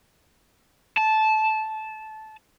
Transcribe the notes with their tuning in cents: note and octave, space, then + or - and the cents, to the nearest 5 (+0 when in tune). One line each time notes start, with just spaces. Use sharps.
A5 -15